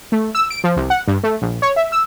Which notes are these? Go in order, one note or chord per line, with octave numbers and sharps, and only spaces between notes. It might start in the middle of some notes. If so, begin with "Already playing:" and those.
A3
E6
D7
F3
C2
F#5
G2
A3
A#1
C#5
E5
E6